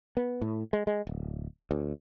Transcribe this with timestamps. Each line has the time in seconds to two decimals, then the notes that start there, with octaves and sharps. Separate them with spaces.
0.17 B3
0.41 A2
0.73 G#3
0.87 G#3
1.07 D1
1.71 D2